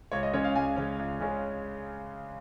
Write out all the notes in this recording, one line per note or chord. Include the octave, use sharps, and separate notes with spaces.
C#2 C#5
D#5
C#3 G#3 C#4 C#5
F5
C#2 G#5
C#3 G#3 C#4
C#2
C#3 G#3 C#4